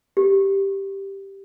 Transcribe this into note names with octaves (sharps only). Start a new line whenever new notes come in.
G4